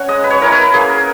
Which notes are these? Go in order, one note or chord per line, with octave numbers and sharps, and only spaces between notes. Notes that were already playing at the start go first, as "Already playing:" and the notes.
Already playing: C#4 F#5 G#5 A#5
G#3 D#5
B4
C#5
C#4 E4 A#4
B4
A#3 G#4
A#4